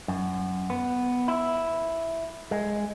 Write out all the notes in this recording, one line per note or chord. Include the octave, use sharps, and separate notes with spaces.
F#2
B3
E4
G#3